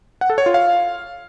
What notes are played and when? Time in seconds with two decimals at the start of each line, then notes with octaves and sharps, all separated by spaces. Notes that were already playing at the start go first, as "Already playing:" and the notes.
0.21 F#5
0.30 A4
0.38 C#5
0.46 F4
0.54 F5